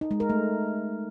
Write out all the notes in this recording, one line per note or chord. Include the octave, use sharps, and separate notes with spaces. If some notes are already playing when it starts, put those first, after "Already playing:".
D#4
G#3
A#4
A3